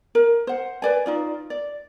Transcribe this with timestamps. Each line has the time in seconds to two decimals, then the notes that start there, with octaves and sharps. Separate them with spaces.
0.15 A#4
0.47 C5 F#5
0.82 B4 D5 G#5
1.06 D#4 F4 D5
1.50 D5